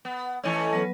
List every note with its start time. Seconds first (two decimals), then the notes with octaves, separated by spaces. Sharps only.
0.05 B3
0.44 E3 A3 C#4 D#5 G#5 A5
0.73 F#3 B3 B4